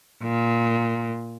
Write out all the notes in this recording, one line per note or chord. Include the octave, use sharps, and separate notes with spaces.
A#2